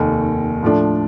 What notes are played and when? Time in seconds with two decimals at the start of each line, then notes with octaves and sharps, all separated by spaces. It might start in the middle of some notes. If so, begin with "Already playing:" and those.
Already playing: F1 D#2 D#3
0.63 A2 F3 A3 D4